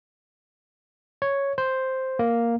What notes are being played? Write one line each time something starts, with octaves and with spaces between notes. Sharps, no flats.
C#5
C5
A#3